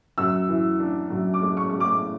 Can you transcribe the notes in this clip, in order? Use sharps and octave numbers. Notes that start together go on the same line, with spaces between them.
F#2 E6
E3
D4
F#2
D6
G#3
C#6
G#3 C#6
D6